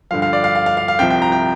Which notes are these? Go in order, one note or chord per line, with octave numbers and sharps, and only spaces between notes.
G2 D3 F3 F5
F5
D5
F5
F5
F5
F5
F5
C2 C3 F3 G5
G5
A#5
G5